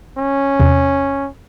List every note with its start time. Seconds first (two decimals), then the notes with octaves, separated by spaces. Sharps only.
0.19 C#4
0.60 E2 C3